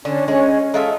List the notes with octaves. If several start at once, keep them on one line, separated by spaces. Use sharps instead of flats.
D3 C#4 D4
G#3 C#4
G#3 F4 A4 E5